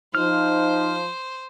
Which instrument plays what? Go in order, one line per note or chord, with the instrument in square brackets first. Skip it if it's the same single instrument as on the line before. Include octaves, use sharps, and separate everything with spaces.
[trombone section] F3 [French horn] D#4 [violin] C5 [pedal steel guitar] F6